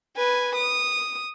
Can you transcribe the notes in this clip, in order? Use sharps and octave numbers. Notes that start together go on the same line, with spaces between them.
B4 G#5
D#6